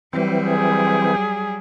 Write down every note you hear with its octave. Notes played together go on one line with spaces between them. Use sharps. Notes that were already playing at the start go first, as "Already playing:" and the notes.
E3 F#3 G3 C4
G#4